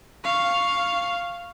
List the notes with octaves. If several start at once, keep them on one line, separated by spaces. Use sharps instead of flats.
F5 C#6